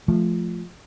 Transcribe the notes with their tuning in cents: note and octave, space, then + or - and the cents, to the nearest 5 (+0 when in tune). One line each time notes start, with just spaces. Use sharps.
F3 +0 A3 -10